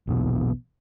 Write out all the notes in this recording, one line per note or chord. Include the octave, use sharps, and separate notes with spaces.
A#1 E2 B2